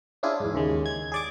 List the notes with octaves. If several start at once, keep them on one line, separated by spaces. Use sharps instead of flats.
C#4 D4 E4 F4 G#4
E2 G#2
D#2 C#3 G#3
G#6
G#4 D5 D6